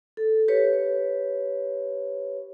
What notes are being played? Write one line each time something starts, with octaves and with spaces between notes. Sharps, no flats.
A4
G4 B4 C#5